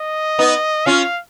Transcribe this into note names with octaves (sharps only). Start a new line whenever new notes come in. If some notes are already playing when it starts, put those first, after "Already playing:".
Already playing: D#5
B3 D#4
C#4 F4 F5